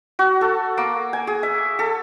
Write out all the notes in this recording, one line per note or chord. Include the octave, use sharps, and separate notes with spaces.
F#4
A4
A#3
G#5
G#4
E5
A4